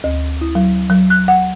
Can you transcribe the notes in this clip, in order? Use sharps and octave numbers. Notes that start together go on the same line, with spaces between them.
D2
E4
F#3
F#3
F#6
F#5